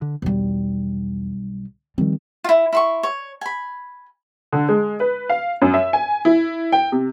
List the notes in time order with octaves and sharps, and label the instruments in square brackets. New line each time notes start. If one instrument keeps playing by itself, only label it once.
[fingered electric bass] D3
[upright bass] B1 G3 [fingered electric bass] E2
[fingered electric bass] D#3 F3 C4 [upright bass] G3
[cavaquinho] E4 F4
E4 C6 C#6
C#5
G#5 B5
[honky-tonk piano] D3
G#3
B4
F5
F#2
E5
G#5
E4
G5
C3